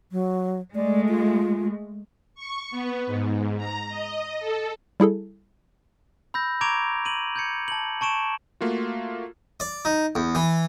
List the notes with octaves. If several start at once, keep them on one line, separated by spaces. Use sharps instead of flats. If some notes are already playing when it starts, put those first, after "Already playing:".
F#3
G#3 A3 D5
F4
C#6
B3
G#2
A#5
D#5
A4
G3 E4 G#4 A4
B5 E6 G6 A#6
A#5 C#6 D6 G#6 D7 F7
D#7 F#7
G6 G#6 C#7
A5 F#7
A5 C#6 D7 E7
A3 A#3 F4 F#4
D5
D#4
E2
E3